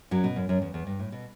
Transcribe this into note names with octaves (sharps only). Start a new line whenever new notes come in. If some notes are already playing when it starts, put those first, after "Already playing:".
F#2 F#3
B2
F#2
F#2
E2
E2
G2
A2
B2